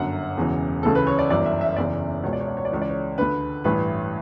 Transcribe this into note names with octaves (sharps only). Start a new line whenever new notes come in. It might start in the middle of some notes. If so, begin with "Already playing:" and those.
Already playing: G1 F#2 D3 F#5
E1 E2 C#3 E3
D2 C#3 E3 A4
B4
C#5
D5
G1 F#2 E3 D5
E5
E5
F#1 E2 C#3 E3 D5
C#2 B2 C#5
D5
C#5
D5
C#5
D5
C#2 C#3 E3 C#5
D5
C#5
D2 D3 B4
A1 G2 E3 B4